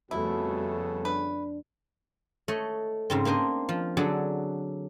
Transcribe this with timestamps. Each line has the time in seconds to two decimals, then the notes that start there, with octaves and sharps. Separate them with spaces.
0.11 F2 C#3 G3 A3 B3 E4 F#4 A4
1.05 D4 B4
2.48 A3 C#5 D#5
3.10 G#2 C#3 C4
3.25 A#3 D4 C5 D#5
3.69 F3
3.97 D3 F#3 D4 G#4 A4